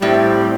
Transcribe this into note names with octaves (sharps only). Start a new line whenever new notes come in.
A2 G3 C4